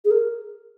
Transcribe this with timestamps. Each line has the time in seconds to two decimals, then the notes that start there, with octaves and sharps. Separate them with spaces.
0.05 G#4
0.11 A#4